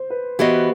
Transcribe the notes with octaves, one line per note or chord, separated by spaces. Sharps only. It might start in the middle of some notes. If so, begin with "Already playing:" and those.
Already playing: C5
B4
E3 B3 F#4 G4 C5 D#5